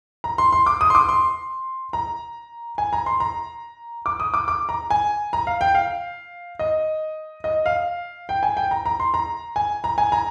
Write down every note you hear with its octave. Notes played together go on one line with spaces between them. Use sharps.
A#5
C6
C6
D6
D#6
C6
D6
C6
A#5
G#5
A#5
C6
A#5
D6
D#6
D6
D6
A#5
G#5
A#5
F5
G5
F5
D#5
D#5
F5
G5
G#5
G5
A#5
A#5
C6
A#5
G#5
A#5
G#5
A#5